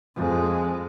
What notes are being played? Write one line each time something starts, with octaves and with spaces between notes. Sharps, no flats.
F2 G#3